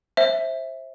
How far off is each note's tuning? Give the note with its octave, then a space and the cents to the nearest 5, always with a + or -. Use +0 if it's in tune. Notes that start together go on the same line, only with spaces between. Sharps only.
C5 +20 E5 -5